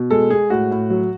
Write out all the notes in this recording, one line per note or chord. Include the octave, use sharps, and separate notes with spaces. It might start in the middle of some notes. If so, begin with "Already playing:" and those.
Already playing: B2
G#3 A4
G#3 G#4
A2 F#4
A2
F#3